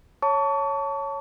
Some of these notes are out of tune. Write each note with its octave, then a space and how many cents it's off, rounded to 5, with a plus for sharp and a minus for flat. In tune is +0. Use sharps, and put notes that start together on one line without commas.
C#5 +0 A5 +10 C#6 +40